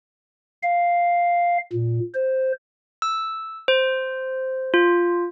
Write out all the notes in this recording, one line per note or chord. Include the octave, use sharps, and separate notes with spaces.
F5
A#2
C5
E6
C5
F4